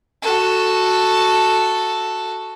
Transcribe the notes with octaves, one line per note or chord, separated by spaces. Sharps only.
F#4 A4